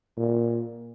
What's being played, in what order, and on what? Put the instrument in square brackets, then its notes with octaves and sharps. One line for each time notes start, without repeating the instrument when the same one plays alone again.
[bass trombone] A#2